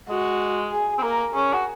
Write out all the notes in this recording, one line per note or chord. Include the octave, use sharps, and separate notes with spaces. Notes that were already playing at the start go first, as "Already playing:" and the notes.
G#3 F#4
G#4
C4
A#3 A#4
C#4 G#4
F#4